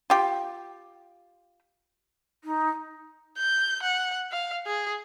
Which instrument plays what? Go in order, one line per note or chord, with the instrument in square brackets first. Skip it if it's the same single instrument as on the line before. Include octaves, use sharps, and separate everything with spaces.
[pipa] F4 G4
[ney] D#4
[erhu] G6
F#5
F5
G#4